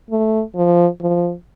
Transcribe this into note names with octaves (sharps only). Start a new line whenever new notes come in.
A3
F3
F3